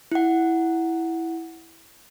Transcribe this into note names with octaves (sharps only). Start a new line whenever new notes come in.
E4 F#5